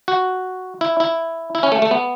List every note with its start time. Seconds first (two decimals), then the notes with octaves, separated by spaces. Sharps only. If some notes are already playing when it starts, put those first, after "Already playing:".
0.08 F#4
0.81 E4
1.00 E4
1.55 E4
1.63 C#4
1.72 A3
1.82 A3
1.91 B3